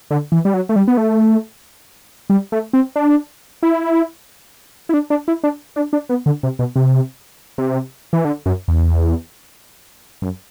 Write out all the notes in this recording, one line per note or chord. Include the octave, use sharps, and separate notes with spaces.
D3
E3
G3
F#3
A3
G3
B3
A3
G3
A3
C4
D4
E4
E4
D4
D4
E4
D4
D4
D4
B3
D3
C3
B2
C3
C3
E3
D3
F#2
E2
F#2